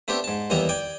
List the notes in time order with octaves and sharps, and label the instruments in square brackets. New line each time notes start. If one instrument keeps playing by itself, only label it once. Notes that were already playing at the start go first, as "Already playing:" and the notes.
[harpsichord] A3 B3 C4 D4 G4
G#2 A5
D#2 E3 G3 B3 D#5 A#5
D5 G5 G#5